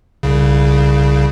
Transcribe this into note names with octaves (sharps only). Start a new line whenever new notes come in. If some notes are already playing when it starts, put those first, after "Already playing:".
C2 C#3